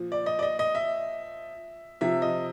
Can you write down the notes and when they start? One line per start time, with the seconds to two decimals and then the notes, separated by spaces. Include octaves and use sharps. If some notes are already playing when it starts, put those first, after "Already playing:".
Already playing: A#2 F3
0.12 D5
0.26 D#5
0.39 D5
0.42 D#5
0.59 D#5
0.75 E5
2.01 C3 F3 E5
2.22 D#5